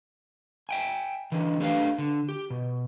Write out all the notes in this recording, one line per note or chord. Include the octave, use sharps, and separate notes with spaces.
E5 G5 G#5
D3 E3 D4
A3 D4 G4 B4 F5
D3
G4
B2